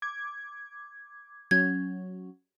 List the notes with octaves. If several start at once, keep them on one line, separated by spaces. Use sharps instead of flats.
D6 G#6
F#3 C#4 G#6